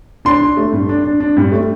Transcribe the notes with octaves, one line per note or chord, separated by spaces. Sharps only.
D4 C6
D4
A3
G2
D4
D4
D4
G2
A3